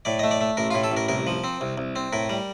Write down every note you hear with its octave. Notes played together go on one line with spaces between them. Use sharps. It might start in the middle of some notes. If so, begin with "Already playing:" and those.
A2 D5
A3 D#5
D5
A3
A1 A#4
A2 F4
A4
A1
A#4
C2 A#4
F3
C4
C2
C2
C4
A2 A#4
G3